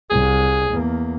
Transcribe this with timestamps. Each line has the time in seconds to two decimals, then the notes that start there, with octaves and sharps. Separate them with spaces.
0.10 C2 G#4
0.70 E2 A#3